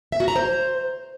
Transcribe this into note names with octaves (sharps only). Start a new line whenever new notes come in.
E5
F#4
A#5
C5